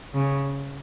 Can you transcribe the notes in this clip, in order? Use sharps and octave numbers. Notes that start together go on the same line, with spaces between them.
C#3